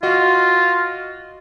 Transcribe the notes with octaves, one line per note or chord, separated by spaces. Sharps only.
F4 F#4 D#5